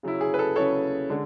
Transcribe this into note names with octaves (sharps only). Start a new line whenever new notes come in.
C#3 F#3 C#4 E4
G#4
B4
A4
C#3 F#3 C#4 E4 A4 C#5
D3 G#3 D4